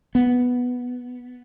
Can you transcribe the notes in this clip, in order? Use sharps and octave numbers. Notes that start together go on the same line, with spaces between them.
B3